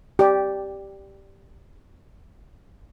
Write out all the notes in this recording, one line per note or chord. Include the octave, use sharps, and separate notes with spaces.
G4 D5